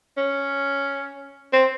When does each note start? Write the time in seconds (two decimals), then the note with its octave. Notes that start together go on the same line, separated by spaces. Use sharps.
0.17 C#4
1.53 C4